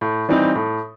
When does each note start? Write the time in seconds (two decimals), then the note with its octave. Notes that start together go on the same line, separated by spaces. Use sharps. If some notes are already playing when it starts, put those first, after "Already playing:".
0.01 A2
0.29 E3 G3 C4 D#4
0.55 A2